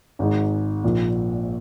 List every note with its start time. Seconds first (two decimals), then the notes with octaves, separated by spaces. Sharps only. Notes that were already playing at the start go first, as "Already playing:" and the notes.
0.19 G#1 G#2 G#3 D#4
0.84 A#1 A#2 F3